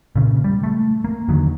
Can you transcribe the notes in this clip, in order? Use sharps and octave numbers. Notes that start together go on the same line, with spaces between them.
A#2 C#3
G3
A3
A#3
E2 D3 D#3 F#3